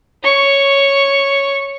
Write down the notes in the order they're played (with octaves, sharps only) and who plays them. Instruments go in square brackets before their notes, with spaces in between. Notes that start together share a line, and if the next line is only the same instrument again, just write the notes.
[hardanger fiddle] C#5 C#6